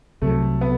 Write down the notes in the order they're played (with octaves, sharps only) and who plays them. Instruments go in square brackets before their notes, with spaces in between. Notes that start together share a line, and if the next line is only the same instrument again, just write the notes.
[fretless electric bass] C2 C3 F#3 [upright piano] A3
[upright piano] B3